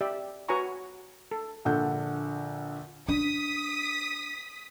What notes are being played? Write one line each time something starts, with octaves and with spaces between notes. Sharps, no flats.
G4 D5 E5
F#4 B4 C#5 G#5 A#5 C#6
A4
A#1 D3 A4 F#5 G6
D4 D#6 B6